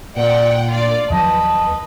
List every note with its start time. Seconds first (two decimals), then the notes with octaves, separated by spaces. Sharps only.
0.16 A#2 D5 F#5 G5
0.69 D2 F4 D5
1.10 D#2 F3 F#3 B4 D#5 A5